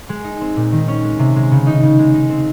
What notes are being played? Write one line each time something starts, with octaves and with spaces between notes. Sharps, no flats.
G#3
D#4
C4
A#2
D#3
C#4
G#3
C3
G#3
C#3
D#4
C#3
G#3
D#4
C4